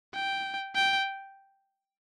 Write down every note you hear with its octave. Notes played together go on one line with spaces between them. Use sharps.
G5
G5